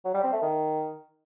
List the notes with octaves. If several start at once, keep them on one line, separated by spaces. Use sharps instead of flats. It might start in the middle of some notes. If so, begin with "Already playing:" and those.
F#3
G3
C4
A3
D#3